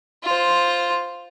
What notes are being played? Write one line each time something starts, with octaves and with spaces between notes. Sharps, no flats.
F4 C5